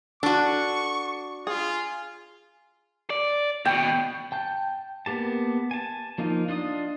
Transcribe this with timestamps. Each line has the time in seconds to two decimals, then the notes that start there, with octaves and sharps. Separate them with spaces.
0.23 D4 F#4 A4 C#6
1.47 F4 G#4
3.10 D5
3.65 D#2 B2 G5
4.32 G5 A5 G6
5.06 A#3 B3 G4 A5
5.71 G#5 A5
6.18 F3 A#3 D#4 F4
6.48 D4 F4 D#5 D#6